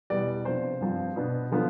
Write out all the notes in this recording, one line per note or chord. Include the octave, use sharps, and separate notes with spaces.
E2 B2 G3 B3 D5
C3 F3 B3 D4 C5
G2 F3 C4
B2 B3 D4
D3 F3 B3